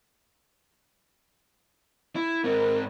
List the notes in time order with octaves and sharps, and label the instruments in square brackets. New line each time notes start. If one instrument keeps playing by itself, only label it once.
[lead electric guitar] E4
[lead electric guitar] G#2 C4 [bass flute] A#4